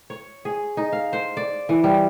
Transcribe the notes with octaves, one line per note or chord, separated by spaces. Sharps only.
C#5
G#4
D#4
F5
C5
D5
E3
G3